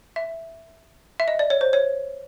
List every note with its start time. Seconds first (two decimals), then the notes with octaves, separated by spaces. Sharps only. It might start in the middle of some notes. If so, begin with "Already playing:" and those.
0.16 E5
1.20 E5
1.28 D#5
1.39 D5
1.50 C#5
1.61 C5
1.73 C#5